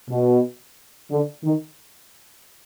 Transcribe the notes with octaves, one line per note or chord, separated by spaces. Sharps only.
B2
D3
D#3